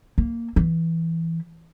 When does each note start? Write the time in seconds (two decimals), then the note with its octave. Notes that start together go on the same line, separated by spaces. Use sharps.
0.18 A#3
0.56 E3